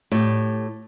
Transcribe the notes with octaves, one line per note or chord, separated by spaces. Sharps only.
A2 G4